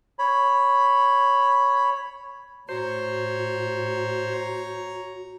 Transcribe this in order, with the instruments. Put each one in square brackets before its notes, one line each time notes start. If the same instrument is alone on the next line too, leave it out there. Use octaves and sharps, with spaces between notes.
[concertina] C#5 B5
[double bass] A2 [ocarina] F#4 [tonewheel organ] C5 [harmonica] C#5 A#5